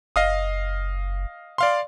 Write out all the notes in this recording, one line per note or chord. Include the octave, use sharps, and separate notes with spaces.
F#1 D#5 F5 D#6
D5 F5 C6